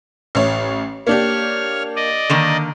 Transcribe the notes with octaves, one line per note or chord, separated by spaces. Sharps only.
A1 C#5
A#3 D4 G4 C#5 F6
D5 D#5
D3 D#3 A#3